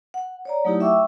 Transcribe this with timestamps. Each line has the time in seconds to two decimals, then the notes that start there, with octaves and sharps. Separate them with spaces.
0.14 F#5
0.45 C#5 D5 A#5
0.65 F#3 A3 D#4 E4 G4
0.80 E5 F#5 G5 C#6 D6 E6